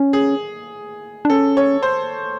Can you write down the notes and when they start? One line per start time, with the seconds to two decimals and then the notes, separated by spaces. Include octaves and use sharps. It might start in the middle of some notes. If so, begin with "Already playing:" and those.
Already playing: C#4
0.13 G#4
1.25 D4
1.30 C#4 A4
1.57 C#5
1.83 C5